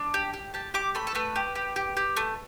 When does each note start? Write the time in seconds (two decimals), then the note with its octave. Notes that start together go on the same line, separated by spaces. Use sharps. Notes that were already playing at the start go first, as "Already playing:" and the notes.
Already playing: D4
0.14 G4
0.34 G4
0.54 G4 A5
0.74 G4 D6
0.95 A3 B5
1.07 A4
1.15 A3 B4
1.36 G4
1.55 G4
1.76 G4
1.97 G4
2.17 A3